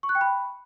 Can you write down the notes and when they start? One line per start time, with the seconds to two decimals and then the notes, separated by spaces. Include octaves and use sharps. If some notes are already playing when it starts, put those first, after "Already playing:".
0.03 C#6
0.09 F#6
0.15 G5
0.21 B5